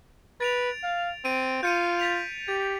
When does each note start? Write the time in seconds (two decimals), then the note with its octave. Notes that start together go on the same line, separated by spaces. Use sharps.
0.40 B4 A6 D7 F7
0.83 F5
1.25 C4 D7 D#7
1.63 F4 G6 C#7 D#7
1.99 A6 B6 F7
2.48 G4 A6